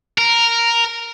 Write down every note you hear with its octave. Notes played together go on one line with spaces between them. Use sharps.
A#4